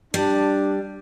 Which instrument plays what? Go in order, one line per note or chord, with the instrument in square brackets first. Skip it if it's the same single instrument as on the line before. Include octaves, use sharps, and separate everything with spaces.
[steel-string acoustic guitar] G3 [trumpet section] D4